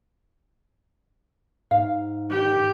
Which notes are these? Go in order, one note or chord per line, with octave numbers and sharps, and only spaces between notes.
G#2 F5
G4 G5